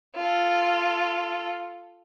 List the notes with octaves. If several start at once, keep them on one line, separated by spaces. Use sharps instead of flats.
F4 A4